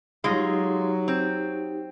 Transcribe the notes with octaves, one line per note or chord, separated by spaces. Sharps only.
F#3 G#3 D#4 F4 G4
C4